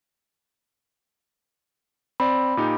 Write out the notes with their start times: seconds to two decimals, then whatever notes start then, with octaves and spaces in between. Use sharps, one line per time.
2.20 C4 D5 B5
2.57 A#2 D#4 G4